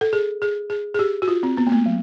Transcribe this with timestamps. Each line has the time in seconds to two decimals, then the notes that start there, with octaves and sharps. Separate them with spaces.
0.01 A4
0.13 G#4
0.42 G#4
0.70 G#4
0.94 G#4
0.99 G4
1.22 F#4
1.28 F4
1.43 C4
1.57 B3
1.67 A#3
1.72 A3
1.86 F#3